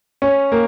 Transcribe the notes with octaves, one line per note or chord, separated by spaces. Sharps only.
C#4
A#3